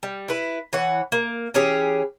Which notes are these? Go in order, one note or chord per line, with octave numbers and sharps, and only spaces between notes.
G3
E4 B4
E3 C#5 F#5
A#3
E3 C#4 G4 G#4